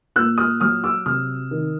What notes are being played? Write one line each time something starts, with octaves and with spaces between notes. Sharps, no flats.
A#2 E6 F#6
D#6 F6
F#3 D#6 F6
D6 E6
C3 D#6 F6
D#3